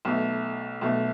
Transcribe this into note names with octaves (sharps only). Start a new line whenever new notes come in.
B1 B2 A3
B1 B2 A3